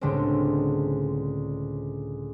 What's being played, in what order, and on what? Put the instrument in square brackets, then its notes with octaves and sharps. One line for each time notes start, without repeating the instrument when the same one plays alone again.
[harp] C#2 A2 D3 G3 G#3 C4